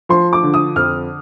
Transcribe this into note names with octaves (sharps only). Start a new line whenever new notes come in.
F3 C6
D6
D3
D#6
F2 F6